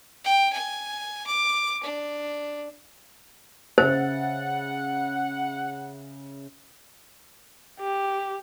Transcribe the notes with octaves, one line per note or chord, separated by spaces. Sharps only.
G5
G#5
D6
D4
C#3 C5 E5 F#5 A6
G4